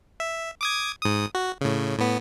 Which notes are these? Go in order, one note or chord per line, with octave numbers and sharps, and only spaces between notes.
E5
D6 D#6 G#6
G#2 D#6
F#4
A2 C#3
A2 B3